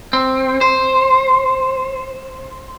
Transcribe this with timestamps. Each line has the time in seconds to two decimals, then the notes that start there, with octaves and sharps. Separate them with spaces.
0.13 C4
0.61 C5